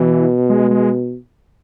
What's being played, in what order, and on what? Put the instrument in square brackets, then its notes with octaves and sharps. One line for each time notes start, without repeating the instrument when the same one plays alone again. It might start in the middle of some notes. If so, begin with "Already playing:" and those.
Already playing: [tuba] B2 [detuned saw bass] E3
[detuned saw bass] G#3
G#3